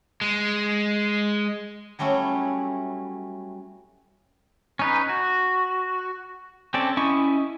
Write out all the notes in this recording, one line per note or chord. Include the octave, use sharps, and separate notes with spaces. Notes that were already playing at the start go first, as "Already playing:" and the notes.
G#3
F#3 G3 A3 C#4 E4
C#4 D#4 B4
F#4
C4 C#4 A4 D5
C#4 E4 D#5 C#6